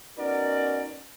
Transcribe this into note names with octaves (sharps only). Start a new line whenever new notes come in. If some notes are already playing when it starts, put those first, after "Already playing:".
B3 C#4 D#4 F#4 A#4 D5